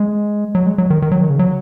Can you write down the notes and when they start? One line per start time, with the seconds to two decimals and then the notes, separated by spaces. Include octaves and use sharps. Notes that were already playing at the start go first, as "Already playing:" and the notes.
Already playing: G#3
0.55 F#3
0.66 G#3
0.78 F#3
0.90 D#3
1.02 D#3
1.12 F#3
1.21 D#3
1.30 C#3
1.39 F#3